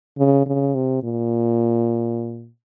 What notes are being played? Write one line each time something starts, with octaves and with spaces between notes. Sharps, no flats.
C#3
C#3
C3
A#2